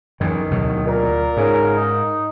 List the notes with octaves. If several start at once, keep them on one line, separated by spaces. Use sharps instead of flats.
F#2 D#3 E3
D2 B2 F#3
A#2 A#4
G#2 C#3
D#4